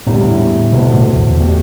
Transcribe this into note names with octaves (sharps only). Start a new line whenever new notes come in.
E2 A2 D3 G3 E4 G4
D2 B2 D3 B3 D4 A4
A2
E2
B2 A3 G4 D5